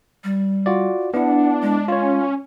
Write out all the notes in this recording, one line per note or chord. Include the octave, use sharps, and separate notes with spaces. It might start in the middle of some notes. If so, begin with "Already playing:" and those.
G3
F4 F#4 D5
B3 D4 E4 F#5
G#3
C#4 F4 C#5